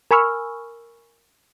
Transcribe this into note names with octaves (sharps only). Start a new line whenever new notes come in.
A#4 G#5 B5 C#6 E6 F6